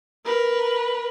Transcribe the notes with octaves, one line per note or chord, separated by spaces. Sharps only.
A#4 B4